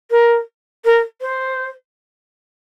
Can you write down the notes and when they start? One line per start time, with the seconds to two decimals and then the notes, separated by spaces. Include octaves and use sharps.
0.10 A#4
0.85 A#4
1.21 C5